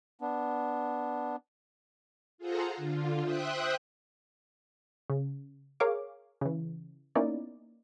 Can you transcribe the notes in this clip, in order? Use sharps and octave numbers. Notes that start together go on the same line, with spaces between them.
B3 D4
F4 G#4 A4 C5 F#5 A#5
D3 F4
C5 E5 G5 D#6 F#6
C#3
G#4 A#4 C#5 F5 D6
C#3 E3
A#3 B3 C#4 D#4 E4 D5